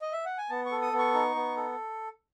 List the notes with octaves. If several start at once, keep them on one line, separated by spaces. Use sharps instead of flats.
D#5
E5
F#5
G#5
B3 A5
C#6
A4
D#6
B3
C#6
D#4
B3
A4